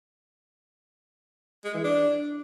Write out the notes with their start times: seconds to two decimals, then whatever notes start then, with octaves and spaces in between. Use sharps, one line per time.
1.64 G#3
1.74 E3
1.84 D4